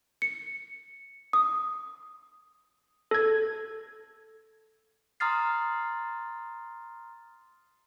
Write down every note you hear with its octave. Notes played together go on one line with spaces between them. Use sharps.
C#7
D#6
A4 G#6
A#5 C6 D#6 F6 A6 C7